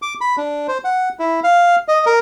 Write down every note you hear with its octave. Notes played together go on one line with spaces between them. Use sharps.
D6
B5
D4
C5
F#5
E4
F5
D#5
A#4